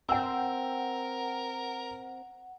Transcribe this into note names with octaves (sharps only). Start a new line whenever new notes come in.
C4 A#4 F#5 G5 E6